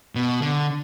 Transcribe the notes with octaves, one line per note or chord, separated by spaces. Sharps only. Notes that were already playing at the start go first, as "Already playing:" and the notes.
B2
D3